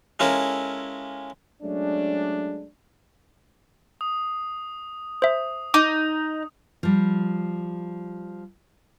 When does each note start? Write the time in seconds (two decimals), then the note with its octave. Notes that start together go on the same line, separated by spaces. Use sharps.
0.20 G#3 C#4 E4 F4 A4 A#4
1.63 F#3 G#3 A3 C#4 D4
4.01 D#6
5.22 C5 E5 D#6
5.74 D#4 D6
6.83 F3 G3